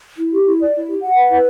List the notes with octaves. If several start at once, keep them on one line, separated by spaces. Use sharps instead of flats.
E4
G4
E4
D5
E4
G4
F#5
B4
E4